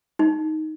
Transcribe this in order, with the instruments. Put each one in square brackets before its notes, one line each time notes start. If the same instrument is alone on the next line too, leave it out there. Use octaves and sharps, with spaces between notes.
[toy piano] D#4